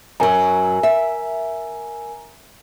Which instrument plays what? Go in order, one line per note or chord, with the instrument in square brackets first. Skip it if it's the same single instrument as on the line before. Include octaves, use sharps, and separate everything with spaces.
[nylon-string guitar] F#2 F#3 [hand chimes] A#4 G#5 A#5
[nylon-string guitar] E5